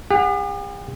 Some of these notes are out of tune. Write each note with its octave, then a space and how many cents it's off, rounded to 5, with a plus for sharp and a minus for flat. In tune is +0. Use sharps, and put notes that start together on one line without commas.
G4 +45 F#5 -10